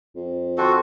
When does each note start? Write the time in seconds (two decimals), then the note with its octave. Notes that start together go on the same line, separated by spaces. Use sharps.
0.16 F2
0.58 F#4 A4 G5 C6 C#6